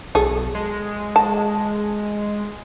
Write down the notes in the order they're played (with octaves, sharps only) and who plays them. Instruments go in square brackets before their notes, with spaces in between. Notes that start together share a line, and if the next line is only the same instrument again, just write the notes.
[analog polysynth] B1 [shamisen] G#4 A4
[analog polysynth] G#3
[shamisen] A5